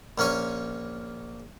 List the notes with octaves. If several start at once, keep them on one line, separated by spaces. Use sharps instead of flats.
A#1 A#3 C#4 C#5 G#5